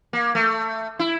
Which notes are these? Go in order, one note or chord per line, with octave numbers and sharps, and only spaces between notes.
A#3
A3
E4